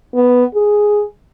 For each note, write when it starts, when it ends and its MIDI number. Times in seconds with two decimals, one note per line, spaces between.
0.15 0.45 59
0.55 1.04 68